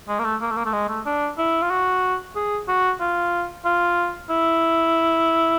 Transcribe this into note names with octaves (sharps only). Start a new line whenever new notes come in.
G#3
A#3
A3
A#3
A3
A#3
A3
G#3
A3
D4
E4
F4
F#4
G#4
F#4
F4
F4
E4